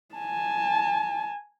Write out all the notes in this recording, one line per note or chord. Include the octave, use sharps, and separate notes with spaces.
G#5 A5